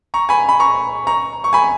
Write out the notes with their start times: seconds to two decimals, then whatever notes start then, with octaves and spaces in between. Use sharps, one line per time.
0.14 A#5 C#6
0.29 G#5 B5
0.49 B5
0.60 A#5 C#6
1.07 A#5 C#6
1.44 C#6
1.53 G#5 B5